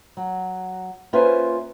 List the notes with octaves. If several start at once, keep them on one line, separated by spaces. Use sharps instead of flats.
F#3
A#3 C#4 F4 B4 C5 E5